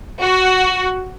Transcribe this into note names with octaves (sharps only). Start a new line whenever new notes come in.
F#4